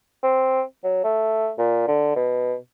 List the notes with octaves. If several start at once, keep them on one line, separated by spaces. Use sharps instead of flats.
C4
F#3
A3
A#2
D3
B2